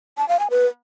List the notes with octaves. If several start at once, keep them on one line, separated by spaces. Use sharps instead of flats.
A5
F5
G#5
B4